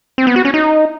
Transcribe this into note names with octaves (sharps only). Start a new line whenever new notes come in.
C4
B3
F#4
C#4
D#4